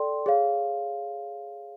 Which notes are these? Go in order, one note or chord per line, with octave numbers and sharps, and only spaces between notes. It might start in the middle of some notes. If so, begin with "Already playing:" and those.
Already playing: A4 D5 G5 C6
G#4 C#5 F5